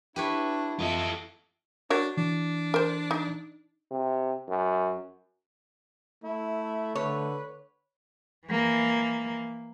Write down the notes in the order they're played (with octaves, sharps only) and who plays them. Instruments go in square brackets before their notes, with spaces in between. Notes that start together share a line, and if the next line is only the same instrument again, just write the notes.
[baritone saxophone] D4 [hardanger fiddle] E4 [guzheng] G4 B4 C#5
[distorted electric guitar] F4 A4 [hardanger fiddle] D#5 E5
[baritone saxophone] D4 [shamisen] F#4 A#4 C#5
[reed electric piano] E3 [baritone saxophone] D4
[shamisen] A#4 C5
D#4
[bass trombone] C3
F#2
[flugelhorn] A3 [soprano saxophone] E4
[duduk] D3 [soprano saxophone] B4 [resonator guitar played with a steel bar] C#5
[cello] E3 A#3